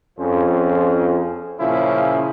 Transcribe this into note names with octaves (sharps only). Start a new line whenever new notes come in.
F2 C#4 F4 G#4 C5
A#2 C#3 F3 C#4 E4